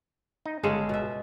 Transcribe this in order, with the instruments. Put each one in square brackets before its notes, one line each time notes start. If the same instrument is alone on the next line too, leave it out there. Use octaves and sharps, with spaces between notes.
[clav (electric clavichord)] D#4
[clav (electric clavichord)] G1 G#4 A4 [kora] C#3 G#3 C#4
[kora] B2 E5